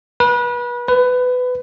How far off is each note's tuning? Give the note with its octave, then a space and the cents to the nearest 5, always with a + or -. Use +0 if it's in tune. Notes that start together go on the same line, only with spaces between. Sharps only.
B4 -30
B4 +20